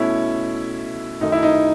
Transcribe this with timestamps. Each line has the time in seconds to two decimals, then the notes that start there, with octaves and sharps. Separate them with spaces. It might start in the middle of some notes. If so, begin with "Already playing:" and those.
Already playing: B2 A3 C#4 E4
1.21 F#2 D#3 A3 D#4
1.32 E4
1.43 D#4